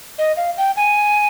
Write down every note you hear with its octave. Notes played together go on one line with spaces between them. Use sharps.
D#5
F5
G5
G#5